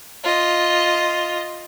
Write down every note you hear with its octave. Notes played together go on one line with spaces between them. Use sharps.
F4 D#5